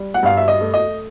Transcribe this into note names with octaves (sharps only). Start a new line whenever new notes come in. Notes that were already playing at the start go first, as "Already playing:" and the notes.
Already playing: G3
F#5
G2 F5
E5
D#5
A3
D#5